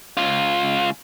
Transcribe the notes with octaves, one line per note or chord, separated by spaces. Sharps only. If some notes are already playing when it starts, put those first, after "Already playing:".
C#2 F4